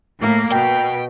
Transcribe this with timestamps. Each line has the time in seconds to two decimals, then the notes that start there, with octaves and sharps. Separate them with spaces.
0.19 A2 A#3
0.52 B2 G5